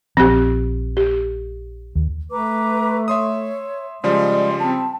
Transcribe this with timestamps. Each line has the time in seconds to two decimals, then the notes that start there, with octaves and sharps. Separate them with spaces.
0.17 A#1 F3 C4 G4
0.97 G4
1.95 D#2
2.30 A3 B4 A#5 D6
3.08 C#5 E5 C6 D#6
4.04 C#3 F3 G3 G#3 D5 C6
4.60 C4 A5 B5